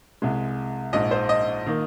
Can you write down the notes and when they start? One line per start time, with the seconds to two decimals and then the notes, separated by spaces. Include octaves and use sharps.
0.22 C2 C3 G#3
0.93 A#1 G#2 G#3 D#5
1.11 C5
1.29 D#5
1.67 D#3 A#3